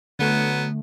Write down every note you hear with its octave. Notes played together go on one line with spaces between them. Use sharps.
D3 F#3 A3 B3